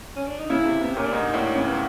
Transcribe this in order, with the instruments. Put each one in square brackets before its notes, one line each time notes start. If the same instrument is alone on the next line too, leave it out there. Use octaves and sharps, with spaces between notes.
[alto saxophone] C#4
D4
D#4
[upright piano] C#3 [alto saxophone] E4
[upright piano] C3
[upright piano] C3 [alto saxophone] B3
[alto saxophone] C4
[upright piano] A#2 [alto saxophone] C#4
[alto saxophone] D4
[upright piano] G#2 [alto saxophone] D#4
[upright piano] A2 [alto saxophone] D4
[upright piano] C#3 [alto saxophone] C#4
[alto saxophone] B3